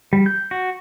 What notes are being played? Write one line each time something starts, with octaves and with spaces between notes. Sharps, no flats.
G3
G6
F#4